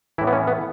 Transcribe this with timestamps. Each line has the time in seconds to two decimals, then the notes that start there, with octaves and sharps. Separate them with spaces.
0.18 E3 E4
0.21 A2
0.27 B3
0.33 C#4
0.47 B3